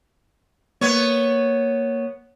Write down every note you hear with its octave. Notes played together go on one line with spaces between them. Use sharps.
A#3 B3 C#5